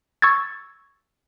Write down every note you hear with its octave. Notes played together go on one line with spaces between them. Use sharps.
C#6 E6 G#6 A6